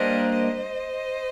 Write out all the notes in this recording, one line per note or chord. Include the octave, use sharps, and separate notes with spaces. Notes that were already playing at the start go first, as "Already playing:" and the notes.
Already playing: G3 A#3 D4 G4 A#4 C5 D#5
C5 D#5